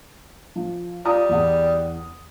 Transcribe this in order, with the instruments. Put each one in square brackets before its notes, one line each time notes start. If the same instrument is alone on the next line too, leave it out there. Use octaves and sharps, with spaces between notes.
[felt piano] F3
[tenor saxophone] G3 [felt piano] F4 A#5 D#6
[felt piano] E2 F#5